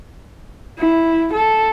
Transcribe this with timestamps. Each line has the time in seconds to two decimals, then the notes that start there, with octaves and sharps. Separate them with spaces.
0.79 E4
1.33 A4